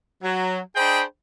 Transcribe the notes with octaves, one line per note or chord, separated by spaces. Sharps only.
F#3
D4 G#4 C5 D#5 G5 B5